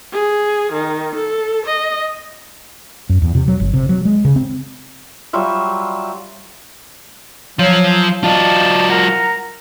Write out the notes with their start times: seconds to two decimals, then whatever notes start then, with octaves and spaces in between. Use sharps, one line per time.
0.12 G#4
0.72 D#3
1.15 A4
1.65 D#5
3.09 F#2
3.22 E2
3.35 C3
3.48 F#3
3.60 G1
3.74 C3
3.89 F#3
4.05 G#3
4.25 C#3
4.36 C4
5.33 F#3 G3 F4 E5
7.59 F3 F#3 F4
8.24 F#3 F4 D5 D#5 A5
8.89 A#4 F#5 A#5